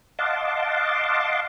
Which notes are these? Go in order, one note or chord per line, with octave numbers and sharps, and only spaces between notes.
D#5 F5 F#5 A5 C6 D6